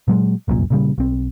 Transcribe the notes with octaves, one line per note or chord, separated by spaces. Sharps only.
A#2 F#3 G#3
F1 C2 F#2 A#2
A#2 C#3 G3
B1 C4